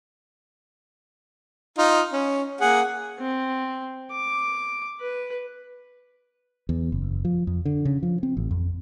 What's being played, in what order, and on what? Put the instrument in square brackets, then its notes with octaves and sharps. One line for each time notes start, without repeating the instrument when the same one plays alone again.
[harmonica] D#4 F4
C#4
A#3 G#4 F#5
[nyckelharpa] C4
D6
B4
[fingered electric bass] E2
F#1
F3
F2
D3
C#3
F3
C4
A1
F2